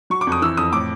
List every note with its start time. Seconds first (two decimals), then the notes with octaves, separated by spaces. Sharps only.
0.10 F#3 C#6
0.21 D6
0.27 F2
0.32 D#6
0.42 E3 E6
0.57 F2 D#6
0.72 A2 D6